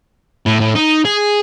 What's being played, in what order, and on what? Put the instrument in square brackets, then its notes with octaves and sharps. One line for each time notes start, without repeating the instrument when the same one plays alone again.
[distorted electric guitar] A2
A2
D#4
G#4